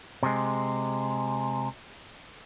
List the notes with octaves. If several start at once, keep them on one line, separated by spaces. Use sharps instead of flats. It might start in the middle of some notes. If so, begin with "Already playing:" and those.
C3 G#3